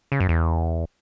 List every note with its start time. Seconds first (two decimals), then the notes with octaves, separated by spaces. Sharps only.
0.12 C#3
0.20 F#2
0.29 E2